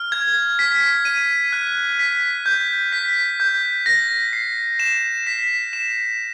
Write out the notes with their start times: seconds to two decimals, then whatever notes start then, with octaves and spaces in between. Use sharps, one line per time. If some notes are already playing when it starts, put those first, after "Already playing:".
Already playing: F6
0.12 G#6
0.59 B6
1.05 D#7
1.52 F#6
1.99 B6
2.46 G6
2.92 B6
3.40 G6
3.86 A#6
4.33 C7
4.80 E7
5.27 B6
5.73 E7